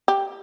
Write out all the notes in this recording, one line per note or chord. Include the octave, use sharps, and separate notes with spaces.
G4